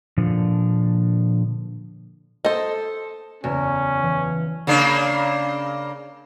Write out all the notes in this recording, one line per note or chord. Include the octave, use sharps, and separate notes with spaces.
A#2 D3 F3
A4 C5 D#5 G#6 A6 B6
F#1 E2 C#4 B6 D7
E3
C#3 A#3 D4